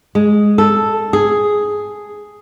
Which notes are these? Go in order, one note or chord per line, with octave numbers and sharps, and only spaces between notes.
G#3
A4
G#4